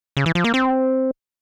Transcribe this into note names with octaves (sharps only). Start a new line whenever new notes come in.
C#3
E3
F3
A#3
C4